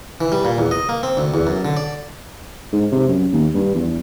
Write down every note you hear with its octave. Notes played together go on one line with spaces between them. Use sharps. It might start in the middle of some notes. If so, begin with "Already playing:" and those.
E3
G3
A#2
E2
D#5
A#3
C4
D2
E2
F#2
D3
D5
G#2
C3
F#2
D#2
G2
E2